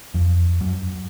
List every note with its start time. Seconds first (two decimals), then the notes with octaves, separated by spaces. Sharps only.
0.14 F2
0.61 F#2